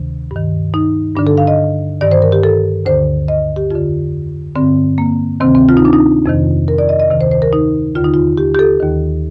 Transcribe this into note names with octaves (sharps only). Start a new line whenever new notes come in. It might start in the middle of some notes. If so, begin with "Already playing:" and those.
Already playing: D2 C3 D#3
G2 D#3
D#4
G2 D3 D4
A4
F5
D#5
G2 D#3 D5
C5
A#4
G4
A4
D2 D3 C5
D#5
G4
F2 D3 F4
G2 D3 C4
A#3
D2 C3 D#3 C4
C4
F4
D#4
D4
D#4
F2 C3 D#3
A#4
D5
D#5
D#5
D2 C3 D#3
C5
C5
A#4
D#4
D#2 D3 F4
D#4
F4
G4
G4
A4
D#2 D#3